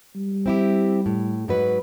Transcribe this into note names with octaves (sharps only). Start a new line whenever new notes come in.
G3
C4 E4 G4
A2
G#2 F#3 B4